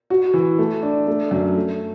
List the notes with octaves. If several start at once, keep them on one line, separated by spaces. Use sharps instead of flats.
F#4
E3
A3
D4
A3
F#2
A3